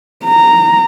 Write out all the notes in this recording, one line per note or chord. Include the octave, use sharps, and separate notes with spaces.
A#5